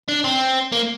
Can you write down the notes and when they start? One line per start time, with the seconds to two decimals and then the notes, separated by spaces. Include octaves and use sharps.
0.08 D4
0.24 C4
0.72 A#3